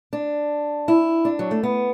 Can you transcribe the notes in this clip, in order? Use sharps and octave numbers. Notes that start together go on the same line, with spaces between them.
D4
E4
D4
F#3
A3
B3